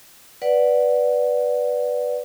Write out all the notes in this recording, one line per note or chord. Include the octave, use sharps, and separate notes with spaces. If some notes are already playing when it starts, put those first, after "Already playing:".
B4 D5 F#5